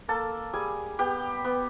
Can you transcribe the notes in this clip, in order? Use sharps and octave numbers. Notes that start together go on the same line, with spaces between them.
A#3 A4 A5
G3 G#4 G#5
B3 G4 G5
B3